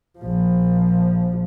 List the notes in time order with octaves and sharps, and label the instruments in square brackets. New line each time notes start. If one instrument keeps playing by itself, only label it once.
[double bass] A#1 F3